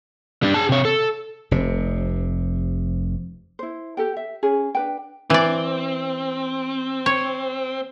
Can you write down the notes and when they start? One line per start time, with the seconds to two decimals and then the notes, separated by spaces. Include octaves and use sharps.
0.43 G3 D4
0.54 G#4 A5
0.69 C3 C#5
0.85 A4
1.51 F1 C3
3.59 E4 C5
3.97 G4 A4 G5
4.17 E5
4.43 C#4 G#4
4.75 D4 B4 G5
5.30 E3 C4 D5
7.06 C#5